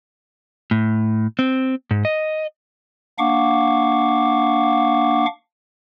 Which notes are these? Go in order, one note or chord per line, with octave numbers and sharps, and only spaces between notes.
A2
C4
G#2
D#5
A#3 D4 F5 F#5 C#6 D6